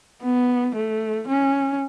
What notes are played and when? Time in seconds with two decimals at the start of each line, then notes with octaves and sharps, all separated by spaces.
0.23 B3
0.75 A3
1.28 C#4